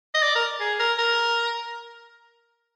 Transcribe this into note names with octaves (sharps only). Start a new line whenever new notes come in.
D#5
D5
A#4
G#4
A#4
A#4